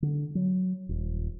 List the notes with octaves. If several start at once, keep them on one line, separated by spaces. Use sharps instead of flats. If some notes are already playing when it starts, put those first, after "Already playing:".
D3
F#3
D#1